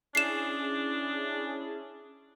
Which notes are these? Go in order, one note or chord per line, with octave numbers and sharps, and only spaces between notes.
C#4 D4 E4 G#4 C7 E7